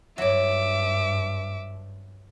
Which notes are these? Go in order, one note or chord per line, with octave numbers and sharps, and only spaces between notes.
G2 F#3 E5 G#5 D6